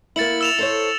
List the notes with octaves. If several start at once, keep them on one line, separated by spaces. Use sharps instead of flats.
A#3 E4 A6 C#7 F#7
E6 E7 F7
A4 C5 C#5